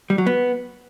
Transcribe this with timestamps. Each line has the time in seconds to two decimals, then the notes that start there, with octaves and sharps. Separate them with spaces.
0.10 G3
0.18 F#3
0.26 B3